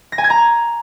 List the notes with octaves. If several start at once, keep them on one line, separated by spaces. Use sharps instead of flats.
A#6
G#5
G#6
A#5